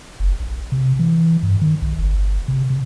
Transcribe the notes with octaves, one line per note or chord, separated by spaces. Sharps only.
F#1
A#1
C3
E3
G2
D#3
B1
G1
C3
C3